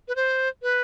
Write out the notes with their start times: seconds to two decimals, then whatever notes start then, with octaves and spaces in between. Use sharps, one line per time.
0.08 B4
0.16 C5
0.62 B4